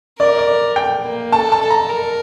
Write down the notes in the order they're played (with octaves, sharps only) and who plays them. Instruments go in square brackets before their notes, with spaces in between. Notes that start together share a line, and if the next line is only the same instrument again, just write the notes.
[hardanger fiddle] A#4 [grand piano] D5
[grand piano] D5
G5
[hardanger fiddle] A#3
[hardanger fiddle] A4 [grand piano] A5
[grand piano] A5
[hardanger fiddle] A4
[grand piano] A#5
[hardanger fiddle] A#4